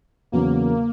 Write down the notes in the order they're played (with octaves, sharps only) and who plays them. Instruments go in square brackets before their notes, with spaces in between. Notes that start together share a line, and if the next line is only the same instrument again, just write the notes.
[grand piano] E2 C#3 F#3 B3 [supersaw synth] A#3